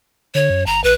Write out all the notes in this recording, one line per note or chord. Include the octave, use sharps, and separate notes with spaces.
D3 C#5
F#2
G1 A#5
A#1 B4